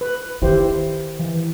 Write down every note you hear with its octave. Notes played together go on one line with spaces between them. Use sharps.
B4
D#3 E4 G4 C5
E3